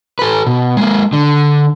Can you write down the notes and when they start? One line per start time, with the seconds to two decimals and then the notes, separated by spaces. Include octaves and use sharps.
0.19 A4 B4
0.47 B2
0.77 G#3 A#3
1.13 D3